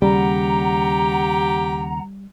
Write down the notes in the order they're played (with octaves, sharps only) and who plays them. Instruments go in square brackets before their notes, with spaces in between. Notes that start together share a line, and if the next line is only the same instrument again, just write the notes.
[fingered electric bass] D#2 C#3 [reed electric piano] G3 [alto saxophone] G4 [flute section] F#5 A#5